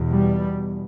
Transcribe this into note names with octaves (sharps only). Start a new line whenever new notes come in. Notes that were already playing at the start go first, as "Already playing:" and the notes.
Already playing: E2 B2
G3